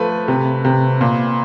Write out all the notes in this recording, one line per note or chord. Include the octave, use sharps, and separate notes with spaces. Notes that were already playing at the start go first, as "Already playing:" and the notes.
Already playing: F3 A3 B4
C3
C3
A#2